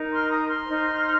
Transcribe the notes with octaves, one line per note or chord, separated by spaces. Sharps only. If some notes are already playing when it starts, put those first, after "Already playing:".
Already playing: D#4 A#4
C6 F6
A#5 D#6
C6 F6
D#4 C5